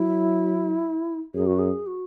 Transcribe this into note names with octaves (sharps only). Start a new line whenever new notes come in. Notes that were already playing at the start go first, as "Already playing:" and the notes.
Already playing: F#3 E4
F#2 G#4
F#4
G#4
F#4